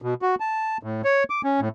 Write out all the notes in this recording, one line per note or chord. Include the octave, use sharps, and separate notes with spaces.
B2
F#4
A5
A2
C#5
D6
C#4
A2